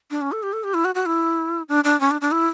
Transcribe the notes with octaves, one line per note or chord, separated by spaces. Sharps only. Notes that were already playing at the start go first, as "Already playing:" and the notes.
D4
C#4
A4
G4
A4
G4
E4
F#4
F#4
E4
D4
D4
C#4
D4
D4
E4